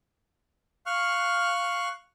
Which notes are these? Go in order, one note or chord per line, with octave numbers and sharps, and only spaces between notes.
F5 C#6 F6 F#6